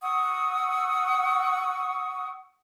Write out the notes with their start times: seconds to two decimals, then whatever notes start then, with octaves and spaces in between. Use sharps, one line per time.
0.01 F#5 C#6 D#6 E6